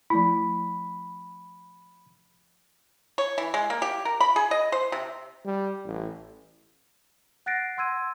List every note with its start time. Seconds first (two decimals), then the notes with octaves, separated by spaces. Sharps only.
0.10 F3 A3 E4 B5
3.18 C#5
3.38 E3
3.54 G#3
3.70 A#3
3.82 G4
4.05 A#4
4.20 B5
4.36 G#4
4.51 D#5
4.72 C5
4.92 C3
5.45 G3
5.85 A1
7.46 F#5 F#6 A6 A#6 C7 D7
7.77 F#5 C6 E6 G#6 D#7